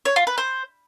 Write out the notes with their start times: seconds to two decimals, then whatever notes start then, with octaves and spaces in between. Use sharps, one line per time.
0.05 C#5
0.16 F4
0.27 B4
0.38 C5